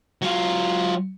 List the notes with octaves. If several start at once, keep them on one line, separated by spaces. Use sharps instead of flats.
F#3 F4